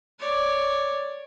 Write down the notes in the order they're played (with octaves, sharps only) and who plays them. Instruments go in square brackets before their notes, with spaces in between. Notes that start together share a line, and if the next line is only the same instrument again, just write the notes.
[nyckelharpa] C#5 D5